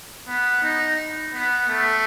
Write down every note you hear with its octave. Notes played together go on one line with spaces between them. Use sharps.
B3
D#4
B3
A3